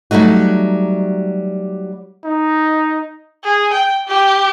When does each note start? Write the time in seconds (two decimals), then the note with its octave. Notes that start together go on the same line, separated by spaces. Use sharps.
0.11 F#3 G3 A3 D#4 F#4
2.25 D#4
3.44 G#4
3.73 G5
4.07 G4